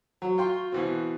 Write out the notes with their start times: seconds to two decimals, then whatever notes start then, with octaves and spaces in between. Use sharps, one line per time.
0.22 F#3 F#4
0.38 F4 G5 C6
0.72 B2 E3 C4